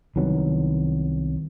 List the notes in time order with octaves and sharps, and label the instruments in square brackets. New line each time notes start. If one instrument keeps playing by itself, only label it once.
[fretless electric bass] C2 D#3 F#3 B3